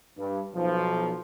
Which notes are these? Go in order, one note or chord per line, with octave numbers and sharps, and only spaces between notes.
G2
B1 F3